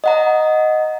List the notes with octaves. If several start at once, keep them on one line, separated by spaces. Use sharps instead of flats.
D#5 F#5 A#5